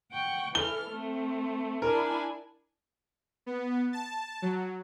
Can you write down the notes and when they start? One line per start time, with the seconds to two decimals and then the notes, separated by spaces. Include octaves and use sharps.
0.11 F#5 G5 C#6
0.55 E3 A4 F6 G7
0.90 A3 C4
1.82 D4 E4 A#4 G#5
3.46 B3
3.93 A5
4.42 F#3